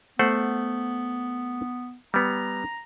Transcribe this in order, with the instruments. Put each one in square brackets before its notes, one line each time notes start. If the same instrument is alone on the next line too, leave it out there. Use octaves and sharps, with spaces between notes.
[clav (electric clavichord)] A3 C5 F#5 [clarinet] B3
[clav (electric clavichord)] G3 B3 [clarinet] A#5